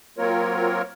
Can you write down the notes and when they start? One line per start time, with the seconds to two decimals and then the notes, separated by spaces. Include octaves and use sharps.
0.18 F#3 A#3 C4 F4 A#4 C#5